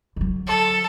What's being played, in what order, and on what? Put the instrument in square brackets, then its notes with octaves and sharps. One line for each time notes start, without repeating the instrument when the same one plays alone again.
[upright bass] D3 F#3
[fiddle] A4